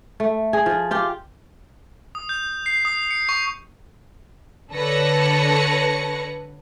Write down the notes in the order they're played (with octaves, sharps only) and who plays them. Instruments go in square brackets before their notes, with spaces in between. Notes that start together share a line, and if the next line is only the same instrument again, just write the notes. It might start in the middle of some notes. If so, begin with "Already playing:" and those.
[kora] A3
G#4
F3
F4 G4
[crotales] D#6
G6
C7
D#6
C#7
C#6
[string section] D3 A4 B4 C#5 A#6 C#7